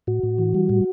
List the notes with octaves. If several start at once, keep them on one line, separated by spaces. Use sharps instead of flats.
A2 F#4
A2
E3
G3
A2